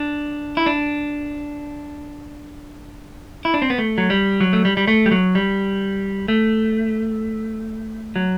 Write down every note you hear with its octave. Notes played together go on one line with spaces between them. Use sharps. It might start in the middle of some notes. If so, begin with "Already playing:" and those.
Already playing: D4
E4
D4
E4
D4
C4
B3
A3
F#3
G3
F#3
A3
G3
G3
A3
G3
F#3
G3
A3
F#3